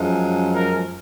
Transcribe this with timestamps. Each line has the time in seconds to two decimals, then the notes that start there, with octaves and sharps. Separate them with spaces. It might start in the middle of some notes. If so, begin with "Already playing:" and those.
Already playing: F#2 F3 G#3
0.54 A#4